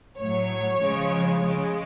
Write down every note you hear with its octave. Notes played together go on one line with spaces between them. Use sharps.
A2 F#3 C#5
C#3 F3 G#3
C#3 G#3